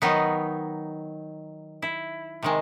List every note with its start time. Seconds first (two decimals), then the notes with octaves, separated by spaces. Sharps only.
0.02 D#3 F#3 B3 D#4
1.82 E4
2.43 C3 D#3 G#3